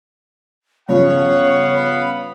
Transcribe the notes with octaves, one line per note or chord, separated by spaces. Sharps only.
G2 C#3 F3 B3 C#5 F5 F#5
B5